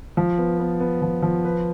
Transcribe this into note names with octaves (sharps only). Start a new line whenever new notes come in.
F3
B3
B3
B3
F3
F3
B4